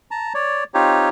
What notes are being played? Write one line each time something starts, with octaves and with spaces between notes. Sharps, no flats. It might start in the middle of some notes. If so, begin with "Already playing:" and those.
A5 A#5
C#5 D5
C4 D#4 F4 G4 C#5